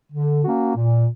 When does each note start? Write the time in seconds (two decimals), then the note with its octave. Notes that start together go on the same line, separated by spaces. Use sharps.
0.12 D3
0.44 A#3 C#4 F#4
0.76 A#2